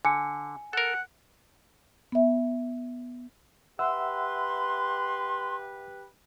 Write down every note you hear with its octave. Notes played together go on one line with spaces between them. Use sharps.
D3 G#5 C#7
A4 A#4 F#5
B3 E5
G4 B4 E5 F#5 C6 E6